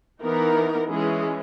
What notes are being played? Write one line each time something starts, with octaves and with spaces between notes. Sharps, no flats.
E3 B3 D#4 A#4
E3 G#3 C#4 G#4